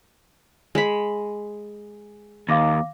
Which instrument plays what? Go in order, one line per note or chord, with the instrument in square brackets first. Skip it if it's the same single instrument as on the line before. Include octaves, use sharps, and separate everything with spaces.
[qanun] G#3 B5
[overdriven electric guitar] D#2 [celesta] F5 D6 A#6